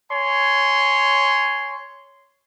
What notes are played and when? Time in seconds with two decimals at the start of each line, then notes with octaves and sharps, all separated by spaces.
0.10 C#5 G#5 C6